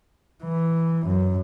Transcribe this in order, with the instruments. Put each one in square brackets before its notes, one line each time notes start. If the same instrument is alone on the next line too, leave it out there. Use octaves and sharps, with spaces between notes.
[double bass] E3
F#2